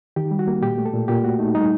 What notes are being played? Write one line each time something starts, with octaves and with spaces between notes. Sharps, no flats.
D#3 G4
G3
F#4
A#3
A#2 G4
A3
A4
A#2
A#2 G4
A3 F#4
A3 D#4
G3 D#4